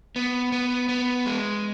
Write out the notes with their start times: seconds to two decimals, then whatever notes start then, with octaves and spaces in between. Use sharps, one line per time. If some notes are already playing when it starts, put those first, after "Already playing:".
0.16 B3
0.52 B3
0.89 B3
1.26 G#3